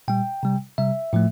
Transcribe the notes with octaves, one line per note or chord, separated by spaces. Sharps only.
A#2 G3 G5
C3 G3
C3 G3 E5
A2 F3 A3